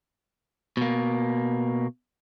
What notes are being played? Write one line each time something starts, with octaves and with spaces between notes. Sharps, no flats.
B2 A#3